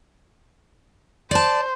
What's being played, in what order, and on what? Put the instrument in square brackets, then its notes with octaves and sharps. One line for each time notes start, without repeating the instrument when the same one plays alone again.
[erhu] C5 [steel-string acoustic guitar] D5 A5